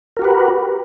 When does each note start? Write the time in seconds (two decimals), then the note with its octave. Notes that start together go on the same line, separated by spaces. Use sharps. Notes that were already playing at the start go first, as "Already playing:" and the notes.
0.17 A#4
0.19 F#4
0.22 G4
0.24 B4